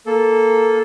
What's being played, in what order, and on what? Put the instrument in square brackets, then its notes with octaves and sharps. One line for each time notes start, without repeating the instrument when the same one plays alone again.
[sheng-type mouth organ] A#3 A4